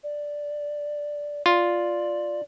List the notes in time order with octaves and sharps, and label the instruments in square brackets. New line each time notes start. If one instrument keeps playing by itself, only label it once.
[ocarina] D5
[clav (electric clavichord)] F4 [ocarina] D5